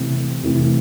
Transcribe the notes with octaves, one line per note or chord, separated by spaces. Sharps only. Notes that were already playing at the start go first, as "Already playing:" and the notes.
Already playing: C3 E3 A3 C4
C3 E3 A3 C4